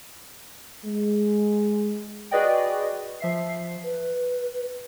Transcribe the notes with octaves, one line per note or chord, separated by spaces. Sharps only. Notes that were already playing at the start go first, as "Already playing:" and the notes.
G#3
F#4 G#4 B4 D5 D#5 G5
F3 E5 C7
B4